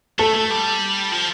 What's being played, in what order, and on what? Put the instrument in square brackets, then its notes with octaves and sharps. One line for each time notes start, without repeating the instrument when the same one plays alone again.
[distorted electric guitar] A3 [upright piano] A4
[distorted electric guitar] A3
G3
F3